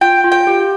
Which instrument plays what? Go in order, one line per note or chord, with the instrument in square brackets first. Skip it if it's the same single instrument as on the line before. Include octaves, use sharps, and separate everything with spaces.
[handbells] F4 [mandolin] G5
[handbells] F4
[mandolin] G5
[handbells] G4